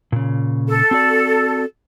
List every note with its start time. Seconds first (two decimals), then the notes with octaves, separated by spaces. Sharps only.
0.12 A#2 C#3
0.68 A4
0.91 C4 F#4 D5